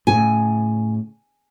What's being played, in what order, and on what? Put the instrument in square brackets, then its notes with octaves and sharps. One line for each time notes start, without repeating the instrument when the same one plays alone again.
[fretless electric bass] A2 C#3 [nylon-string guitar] G#5